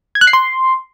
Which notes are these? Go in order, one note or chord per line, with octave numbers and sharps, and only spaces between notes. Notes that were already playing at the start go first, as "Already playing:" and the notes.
G#6
F#6
C7
C6